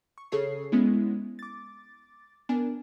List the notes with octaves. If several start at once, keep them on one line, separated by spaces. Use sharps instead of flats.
C#6
C#3 G#4 A4 C#5 C7
G#3 B3 C#4 E4
D6 A6
B3 D4 A#4 G#5